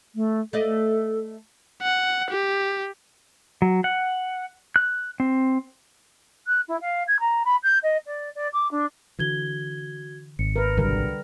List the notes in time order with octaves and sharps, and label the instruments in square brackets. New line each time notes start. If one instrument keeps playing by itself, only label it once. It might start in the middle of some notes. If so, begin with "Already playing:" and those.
[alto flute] A3
[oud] A3 D5 D#5 [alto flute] A4
[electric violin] F#5
G4
[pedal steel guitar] F#3
F#5
F#6
C4
[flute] F#6
E4
F5
G#6
A#5
B5
G6
D#5
D5
D5
D6
D4
[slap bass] D3 E3 [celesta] F#4 G#6 G7
[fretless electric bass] G#1 [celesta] C#7
[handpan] A#4 B4
[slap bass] C2 B2 F#3 [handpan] D3 G3 A#4